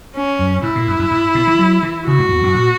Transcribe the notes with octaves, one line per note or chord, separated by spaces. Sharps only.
C#4
F#2
G#2 E4
A#2
F#2
F#2
G#2
B2
E3
F#3
E3
C#3 F#4
G#2
E2
F#2
A#2